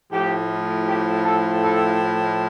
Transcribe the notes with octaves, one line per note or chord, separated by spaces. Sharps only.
A2 F3 G4
G4
A4
A4